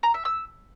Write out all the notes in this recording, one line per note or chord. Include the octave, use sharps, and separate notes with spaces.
A#5
E5
E6